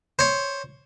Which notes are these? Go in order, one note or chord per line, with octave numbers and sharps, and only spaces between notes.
C5 C#5